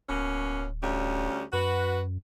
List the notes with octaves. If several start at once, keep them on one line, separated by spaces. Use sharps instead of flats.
D1 B2 A#3 C#4
D2 G3 C#4
F#2 F#4 B4